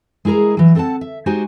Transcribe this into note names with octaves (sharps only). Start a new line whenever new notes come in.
G#3 E4 G#4 A#4 A#5
E3 F#3
C4 A4 D#5 F#5 A5
E5
G#3 D#4 F#4 G4 C5 G#5